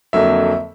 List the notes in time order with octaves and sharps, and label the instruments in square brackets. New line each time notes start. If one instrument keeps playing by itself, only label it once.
[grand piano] F2 D3 F#3 A#3 E5